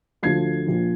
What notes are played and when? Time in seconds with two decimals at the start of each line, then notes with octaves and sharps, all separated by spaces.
0.23 D2 D3 F3 G#6 C7
0.67 A#1 A#2 F3